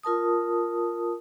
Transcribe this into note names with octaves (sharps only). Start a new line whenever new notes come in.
F4 A#4 A5 D#6